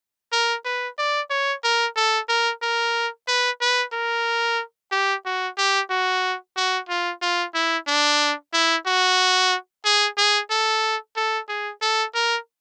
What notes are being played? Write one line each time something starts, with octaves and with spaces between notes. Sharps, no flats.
A#4
B4
D5
C#5
A#4
A4
A#4
A#4
B4
B4
A#4
G4
F#4
G4
F#4
F#4
F4
F4
E4
D4
E4
F#4
G#4
G#4
A4
A4
G#4
A4
A#4